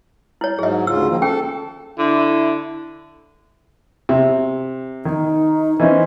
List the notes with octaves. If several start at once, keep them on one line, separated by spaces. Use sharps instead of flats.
E4 C#5
G#2 F#3 G#4 D#5
D2 C#3 F4 E6
D#3 F3 A#3
C#4 G#4 A4 G5
D3 E4
C3
D#3 D#4
E3 C#4 C5 D#5